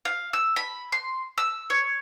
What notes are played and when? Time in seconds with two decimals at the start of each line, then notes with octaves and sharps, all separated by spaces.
0.05 F5
0.33 E6
0.56 B5
0.92 C6
1.38 E6
1.70 C#5